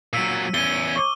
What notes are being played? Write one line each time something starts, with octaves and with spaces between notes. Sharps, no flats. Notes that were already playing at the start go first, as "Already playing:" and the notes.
A#2 F#3 E6 B6 D#7
E2 C#4 D#7 G7
C#6 D6